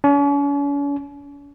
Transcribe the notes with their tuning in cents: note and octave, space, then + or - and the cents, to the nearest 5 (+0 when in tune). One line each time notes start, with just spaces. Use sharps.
C#4 +45